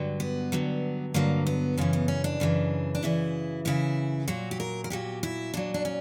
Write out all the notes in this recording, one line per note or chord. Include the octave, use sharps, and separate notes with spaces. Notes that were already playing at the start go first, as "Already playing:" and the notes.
Already playing: G2 D3 F#3
B3
G2 D3 F#3
G2 D3 F#3 A#3
B3
F#2 C#3 E3 C#4
B3
C#4
D4
F#2 C#3 E3
D4
F#2 C#3 E3 E4
F#2 C#3 E3 E4
A#2 F#3 F#4
G4
A#4
A#4
A#2 F#3 G4
E4
A#2 F#3 D4
D4
C#4